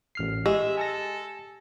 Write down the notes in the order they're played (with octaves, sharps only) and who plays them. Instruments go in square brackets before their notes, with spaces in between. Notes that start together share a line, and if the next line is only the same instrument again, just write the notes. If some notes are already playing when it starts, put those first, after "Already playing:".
[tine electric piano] A1 F6 C7
[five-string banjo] G#3 [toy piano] G4 [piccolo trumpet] E5 [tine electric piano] E6
[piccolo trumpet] A4 [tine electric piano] G#5 A#6